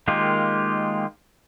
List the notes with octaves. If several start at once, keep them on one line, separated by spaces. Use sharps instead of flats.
D#3 G#3 A#3 F4 G4